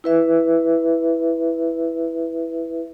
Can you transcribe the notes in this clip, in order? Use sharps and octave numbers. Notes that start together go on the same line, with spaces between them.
E4 B4 E5